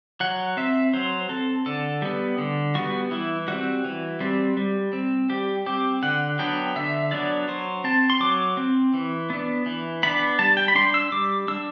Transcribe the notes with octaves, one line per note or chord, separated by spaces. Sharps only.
F#3 F#5
C4 E5
F#3 C5
C4 A4
D3 A4
G3 B3
D3
G3 B3 F#4
E3 E4
G3 C4 F#4
E3
G3 C4
G3
C4
G3 G4
C4 G4
D3 F#5
F#3 B3 D4 G5
D3 E5
F#3 B3 D4 D5
F#3 C5
C4 A5
C6
F#3 D6
C4
E3
B3 D4
E3
B3 D4 B5
G3 A5
G5
B5
D4 C6
E6
G3 D6
D4 E6